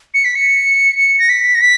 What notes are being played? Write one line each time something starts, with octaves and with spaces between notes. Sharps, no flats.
C#7
B6
C#7
C#7
A#6
B6
A#6
B6